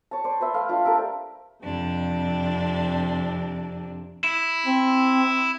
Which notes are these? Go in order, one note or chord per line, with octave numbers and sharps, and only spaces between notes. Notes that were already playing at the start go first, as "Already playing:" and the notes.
C#5 A5
C5 D5
B4 C5 E5
A3 F5
D4 F4
G4 A4 A#4 E5
F2 C3 D4
E4
C4